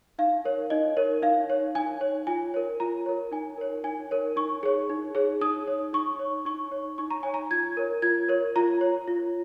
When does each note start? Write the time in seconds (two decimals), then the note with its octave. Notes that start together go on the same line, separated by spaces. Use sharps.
0.19 D#4 F5
0.45 A#4 C#5
0.70 D#4 D#5
0.97 A#4 C#5
1.22 D#4 F5
1.50 C#5
1.75 D#4 G#5
2.01 C#5
2.27 F4 G#5
2.54 A#4 C#5
2.80 F4 A#5
3.06 A#4 C#5
3.32 D#4 G#5
3.58 A#4 C#5
3.84 D#4 G#5
4.11 A#4 C#5
4.36 D#4 C#6
4.63 G#4 C#5
4.89 D#4
5.15 G#4 C#5
5.41 D#4 D#6
5.67 C#5
5.93 D#4 C#6
6.19 C#5
6.45 D#4 C#6
6.72 C#5
6.98 D#4 C#6
7.11 A#5
7.23 C#5 G#5
7.34 A#5
7.51 F4 G#6
7.77 A#4 C#5
8.02 F4 G#6
8.29 A#4 C#5
8.56 F4 A#5
8.81 C#5
9.08 F4